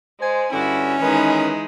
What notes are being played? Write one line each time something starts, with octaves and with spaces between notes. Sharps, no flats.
G#3 C5 G#5
G2 D3 C#4 E4 F#4
D#3 E3 G#3 D#4 B4